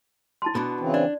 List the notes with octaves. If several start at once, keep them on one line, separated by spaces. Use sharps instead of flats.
E4 A5 C6
B2 B3 D4
C#3 E3 C4
D4 D5